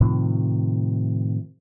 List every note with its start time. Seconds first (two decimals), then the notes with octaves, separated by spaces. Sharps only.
0.01 A2 C3 D#3 F3